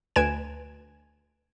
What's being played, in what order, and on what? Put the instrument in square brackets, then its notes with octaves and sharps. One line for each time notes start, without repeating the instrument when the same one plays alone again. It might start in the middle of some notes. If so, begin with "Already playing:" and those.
[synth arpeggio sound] D2 B4 G#5 G#6 D7 E7